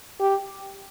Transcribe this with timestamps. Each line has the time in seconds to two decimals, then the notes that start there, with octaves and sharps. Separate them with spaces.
0.20 G4